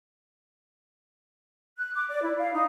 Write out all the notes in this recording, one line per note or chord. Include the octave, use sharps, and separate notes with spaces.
F#6
D6
D5
E4
F5
D#4